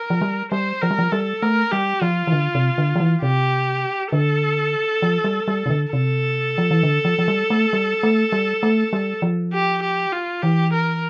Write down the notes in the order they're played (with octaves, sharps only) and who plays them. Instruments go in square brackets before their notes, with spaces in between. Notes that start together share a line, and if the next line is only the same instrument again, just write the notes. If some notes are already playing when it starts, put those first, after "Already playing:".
Already playing: [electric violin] A#4
[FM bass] F3
G3
[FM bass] G3 [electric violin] C5
[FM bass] F3 [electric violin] A#4
[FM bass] G3
F3
[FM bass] G3 [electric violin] A4
[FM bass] A3 [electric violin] A#4
[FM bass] G3 [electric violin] G4
[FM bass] F3 [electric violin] F4
[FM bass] E3
D3
C3
D3
F3
E3
[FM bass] C3 [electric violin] G4
[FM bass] D3 [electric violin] A4
[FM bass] F3
G3
G3
C3
D3
[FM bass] C3 [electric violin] A4
[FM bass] F3
E3
D3
F3
F3
G3
A3
G3
A3
G3
A3
G3
F3
[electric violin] G4
G4
F4
[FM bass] E3 [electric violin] G4
[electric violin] A#4